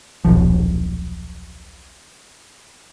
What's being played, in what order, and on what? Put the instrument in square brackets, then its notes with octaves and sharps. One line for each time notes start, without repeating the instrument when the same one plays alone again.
[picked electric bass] D#1 B1 F3